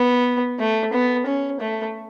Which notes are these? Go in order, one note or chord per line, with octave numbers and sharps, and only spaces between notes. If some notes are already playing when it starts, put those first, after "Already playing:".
Already playing: B3
A3
B3
C#4
A3